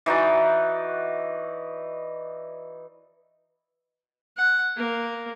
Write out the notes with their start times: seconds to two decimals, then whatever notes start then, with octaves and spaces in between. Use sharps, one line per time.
0.06 E3 D#4 F#4 D5
4.37 F#5
4.77 A#3